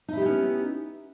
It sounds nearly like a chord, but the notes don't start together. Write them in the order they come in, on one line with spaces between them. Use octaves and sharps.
D#4 E4 G4 B3 C#4